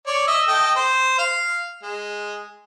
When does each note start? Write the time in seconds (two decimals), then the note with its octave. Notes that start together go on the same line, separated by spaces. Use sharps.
0.07 C#5 D5
0.27 D#5 E5 E6
0.48 A4 D#5 G5
0.76 C5
1.18 F5
1.83 G#3